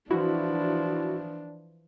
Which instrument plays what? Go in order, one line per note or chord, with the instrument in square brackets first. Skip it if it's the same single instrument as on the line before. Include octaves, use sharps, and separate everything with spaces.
[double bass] E3 F3 [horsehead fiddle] D4 [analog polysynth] E4 F#4